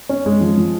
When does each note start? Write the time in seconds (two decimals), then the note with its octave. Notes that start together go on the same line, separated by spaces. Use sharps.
0.09 C#4
0.26 G#3
0.41 F3
0.58 F3